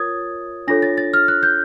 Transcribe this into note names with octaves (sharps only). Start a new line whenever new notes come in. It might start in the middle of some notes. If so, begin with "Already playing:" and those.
Already playing: F4 A#4 C#5 D#6 G#6 A6
D4 F4 A4 C#5 A#6
A6
A6
F6
F#6
G6